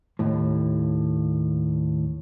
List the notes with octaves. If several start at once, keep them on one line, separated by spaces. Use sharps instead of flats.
D#2 A2